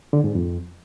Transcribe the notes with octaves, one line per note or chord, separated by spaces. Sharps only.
D3
G#2
F2